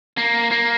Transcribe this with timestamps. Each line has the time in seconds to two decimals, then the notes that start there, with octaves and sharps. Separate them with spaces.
0.18 A#3
0.51 A#3